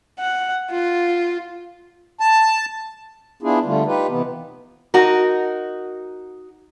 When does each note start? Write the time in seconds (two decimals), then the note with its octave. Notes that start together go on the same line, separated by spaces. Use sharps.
0.20 F#5
0.71 F4
2.20 A5
3.43 B3 D4 E4 F4 G#4
3.65 D3 G3 A3 F4
3.86 D#4 F4 G4 B4
4.09 C3 E3 B3
4.94 D#4 F#4 A#4